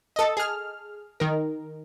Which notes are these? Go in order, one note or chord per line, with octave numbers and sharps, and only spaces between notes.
A4 D#5
G#4 F6
D#3 A#4